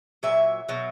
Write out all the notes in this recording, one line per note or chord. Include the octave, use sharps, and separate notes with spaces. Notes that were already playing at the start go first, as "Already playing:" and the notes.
A#2 F#3 E5
B2 F#3